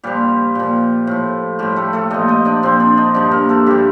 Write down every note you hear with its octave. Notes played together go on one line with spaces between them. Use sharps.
A#2 F3 G3 G4
A#2 F3
A2 F3
A2 F3 G3 G4
A3 A4
A3 A4
A#2 F3 D#4 D#5
D#4 D#5
D4 D5
A#2 F3 C4 C5
D4 D5
D#4 D#5
G2 F3 D4 D5
A#3 A#4
A3 A4
G2 F3 G3 G4